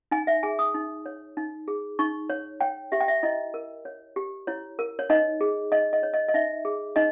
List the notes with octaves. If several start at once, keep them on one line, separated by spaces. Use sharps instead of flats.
D#4 G#5
E5
G#4 G#5
D#6
D#4
C#5
D#4
G#4
D#4 C#6
C#5
C#5 G5
G4 E5
G5
E5
E4 D#5
A#4
C#5
G4
E4 C#5
A#4
C#5
D#4 D#5
G#4
D#4 D#5
D#5
C#5
D#5
D#5
D#4 E5
G#4
D#4 D#5